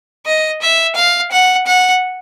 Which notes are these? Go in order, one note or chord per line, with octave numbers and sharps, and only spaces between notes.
D#5
E5
F5
F#5
F#5